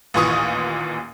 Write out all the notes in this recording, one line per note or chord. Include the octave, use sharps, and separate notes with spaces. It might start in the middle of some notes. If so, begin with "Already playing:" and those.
A1 D#2 A#2 E3 C#6 D#6